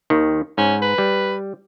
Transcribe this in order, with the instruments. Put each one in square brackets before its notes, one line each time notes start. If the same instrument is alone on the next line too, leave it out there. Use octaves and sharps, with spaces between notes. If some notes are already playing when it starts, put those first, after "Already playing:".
[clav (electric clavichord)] D#2 D#3
[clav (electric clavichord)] G#2 [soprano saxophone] C#4
[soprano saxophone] B4
[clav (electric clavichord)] G3